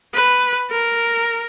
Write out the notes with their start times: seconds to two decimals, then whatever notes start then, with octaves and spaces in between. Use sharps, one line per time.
0.15 B4
0.71 A#4